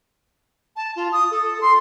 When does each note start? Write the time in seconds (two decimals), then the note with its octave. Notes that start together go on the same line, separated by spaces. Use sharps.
0.76 A5
0.96 F4
1.12 D#6
1.31 A4
1.61 C6